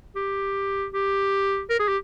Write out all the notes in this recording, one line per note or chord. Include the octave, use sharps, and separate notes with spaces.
G4
G4
A#4
G#4
G4